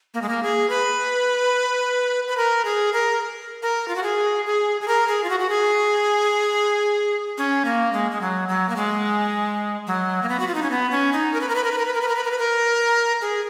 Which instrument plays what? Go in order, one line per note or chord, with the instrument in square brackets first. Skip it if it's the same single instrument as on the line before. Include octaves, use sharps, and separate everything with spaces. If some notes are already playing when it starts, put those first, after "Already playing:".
[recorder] A#3
G#3
A#3
G#4
B4
B4
A#4
G#4
A#4
A#4
F4
F#4
G#4
G#4
G#4
A#4
G#4
F4
F#4
F#4
G#4
C#4
A#3
G#3
G#3
F#3
F#3
A#3
G#3
F#3
A#3
B3
F#4
F4
D#4
C#4
B3
C#4
D#4
A#4
B4
A#4
B4
A#4
B4
A#4
B4
A#4
B4
A#4
B4
A#4
B4
A#4
G#4